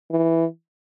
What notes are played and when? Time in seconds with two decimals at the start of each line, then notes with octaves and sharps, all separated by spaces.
0.11 E3